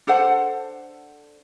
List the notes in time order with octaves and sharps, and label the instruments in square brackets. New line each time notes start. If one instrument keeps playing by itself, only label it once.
[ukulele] D4 A4 C5 F#5